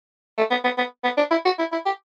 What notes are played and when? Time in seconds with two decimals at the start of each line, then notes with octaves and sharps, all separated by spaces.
0.38 A3
0.51 B3
0.64 B3
0.78 B3
1.04 B3
1.18 D4
1.31 E4
1.45 F#4
1.59 E4
1.72 E4
1.86 G4